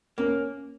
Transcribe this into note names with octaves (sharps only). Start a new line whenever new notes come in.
A#3 C#4